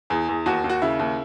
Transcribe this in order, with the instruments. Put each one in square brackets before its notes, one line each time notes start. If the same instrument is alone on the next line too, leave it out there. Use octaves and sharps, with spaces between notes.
[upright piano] E2 G#4
E2
D#2 F#4
D#2
F#4
C#3 E4
D#2